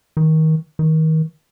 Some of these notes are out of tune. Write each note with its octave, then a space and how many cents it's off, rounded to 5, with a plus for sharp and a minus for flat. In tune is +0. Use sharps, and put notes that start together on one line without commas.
D#3 +25
D#3 +30